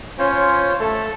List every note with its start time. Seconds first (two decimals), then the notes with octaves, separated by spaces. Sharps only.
0.19 C#4 F4 C5 C#5
0.80 A3 A4